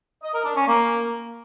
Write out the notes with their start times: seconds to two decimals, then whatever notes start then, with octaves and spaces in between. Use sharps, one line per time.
0.23 D#5
0.34 A#4
0.45 D4
0.56 C#4
0.67 A#3